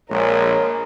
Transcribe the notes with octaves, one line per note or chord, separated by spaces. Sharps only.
A#1 G#3 A#4 C#5